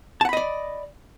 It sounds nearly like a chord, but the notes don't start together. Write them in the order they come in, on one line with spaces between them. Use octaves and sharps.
A5 F#5 B5 D#5 D5